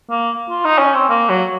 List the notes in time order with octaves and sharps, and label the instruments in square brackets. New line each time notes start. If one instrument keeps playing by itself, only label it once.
[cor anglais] A#3
F4
D#4
C#4
C4
A#3
F#3